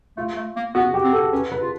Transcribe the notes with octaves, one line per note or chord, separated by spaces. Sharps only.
A3 F4
A3
A#3
B3 F#4
G4
C4
A4
C#4 B4
B4
F4